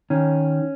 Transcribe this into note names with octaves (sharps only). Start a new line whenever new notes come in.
D#3 C#4